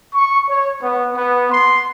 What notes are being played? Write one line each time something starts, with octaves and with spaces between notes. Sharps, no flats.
C#6
C#5
B3
B3
C6